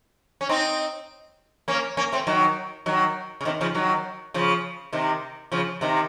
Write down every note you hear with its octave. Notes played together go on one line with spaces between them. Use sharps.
C#4
C4 D#4
A#3 C#4
A#3 C#4
A3 C4
D#3 F#3
D#3 F#3
C#3
C3 D#3
C#3 F3
D#3 F#3
C#3 F3
C3 D#3
C#3 F3
C3 D#3